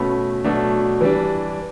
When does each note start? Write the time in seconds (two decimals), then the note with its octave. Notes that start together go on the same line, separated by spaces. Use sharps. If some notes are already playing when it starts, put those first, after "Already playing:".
Already playing: B2 A3 C#4 B5
0.45 B2 F#3 A3 D4
1.01 E3 G3 D4